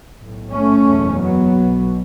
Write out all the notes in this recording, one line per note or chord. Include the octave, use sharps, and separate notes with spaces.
B1 A2
A3 C#4
F#1 E2 B2
F#3 B3
B1 B2